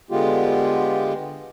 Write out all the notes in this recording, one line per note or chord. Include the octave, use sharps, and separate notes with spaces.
D3 G#3 B3 F4 G4